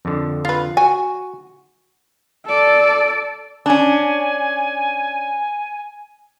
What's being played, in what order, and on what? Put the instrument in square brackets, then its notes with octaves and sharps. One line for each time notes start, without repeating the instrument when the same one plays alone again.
[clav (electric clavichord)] F2 D3
[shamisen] F4 B4
[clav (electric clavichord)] F#4 [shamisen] G#5
[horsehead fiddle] A4 D5
[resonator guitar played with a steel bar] C#4 D4 [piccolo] G#5